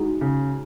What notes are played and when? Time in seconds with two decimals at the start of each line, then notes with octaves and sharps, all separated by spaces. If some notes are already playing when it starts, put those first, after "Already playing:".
Already playing: G#3 D#4 F#4
0.21 C#3